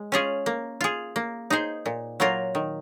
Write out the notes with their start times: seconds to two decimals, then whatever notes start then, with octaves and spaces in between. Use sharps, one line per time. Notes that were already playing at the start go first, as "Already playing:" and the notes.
Already playing: G#3
0.12 C#4 F4 G#4
0.46 A#3
0.81 F4 G#4
1.16 A#3
1.50 D#4 G#4 C5
1.86 A#2
2.20 F#3 A#3 F4 A#4
2.55 D#3